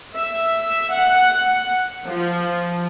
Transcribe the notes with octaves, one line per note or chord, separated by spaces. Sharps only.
E5
F#5
F3